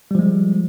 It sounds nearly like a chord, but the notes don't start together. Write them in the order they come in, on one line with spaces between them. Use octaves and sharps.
G3 F3 G#3